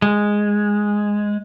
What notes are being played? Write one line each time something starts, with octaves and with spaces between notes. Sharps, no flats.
G#3